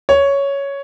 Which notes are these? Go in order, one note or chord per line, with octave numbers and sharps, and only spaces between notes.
C#5